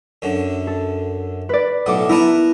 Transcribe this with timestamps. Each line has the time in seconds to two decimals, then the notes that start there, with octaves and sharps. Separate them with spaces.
0.22 F#2 D3
0.67 A4
1.49 B4 D5
1.86 B1 A2 F#5 D6 D#6
2.09 B3 E4 A#4 B4 A5